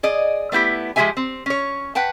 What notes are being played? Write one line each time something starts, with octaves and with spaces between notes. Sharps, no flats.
G#4 D5 D#5
A3 B3 E4 G4
F3 G#3 A#3 G4 E5 G#5
C4
C#4 C#5
B4 F#5 G5 A5